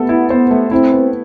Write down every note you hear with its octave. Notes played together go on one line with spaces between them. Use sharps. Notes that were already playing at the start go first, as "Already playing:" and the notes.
Already playing: A3 B3 A4
E4
B3 C5
A3
C4 E4
B3